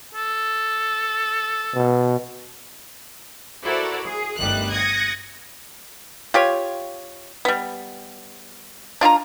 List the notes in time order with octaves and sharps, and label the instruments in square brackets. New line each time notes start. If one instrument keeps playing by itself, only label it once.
[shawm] A4
[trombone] B2
[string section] E4 F#4 A4 A#4 C5 D5
G#4
G1 D2 D#3 G3 F#6
D#6 F#6 G#6 A#6 C#7
[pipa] F4 G4 C#5
G3 B3
D4 F4 E5 A#5